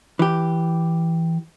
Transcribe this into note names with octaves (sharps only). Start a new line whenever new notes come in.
E3 G4